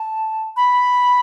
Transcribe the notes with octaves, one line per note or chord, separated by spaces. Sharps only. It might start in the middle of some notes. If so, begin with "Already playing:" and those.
Already playing: A5
B5